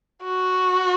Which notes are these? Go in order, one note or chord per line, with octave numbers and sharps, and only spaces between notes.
F#4